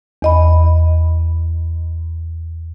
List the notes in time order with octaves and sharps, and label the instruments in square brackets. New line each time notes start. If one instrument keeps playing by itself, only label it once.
[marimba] E2 D#5 B5